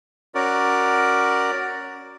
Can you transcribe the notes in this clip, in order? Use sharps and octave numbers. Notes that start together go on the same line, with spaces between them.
C#4 F#4 A#4 D5